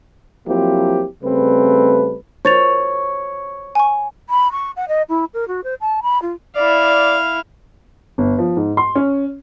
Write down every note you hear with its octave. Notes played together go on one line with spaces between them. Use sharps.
F3 F#3 A#3 C4 E4 G4
C#3 G3 A3 C4 B4
C5 C#5 A6 F7
G#5 C#6
B5
C#6
F#5
D#5
E4
A#4
F#4
C5
A5
B5
F4
E4 D5 F5
G1
F3
G#2
C6
C#4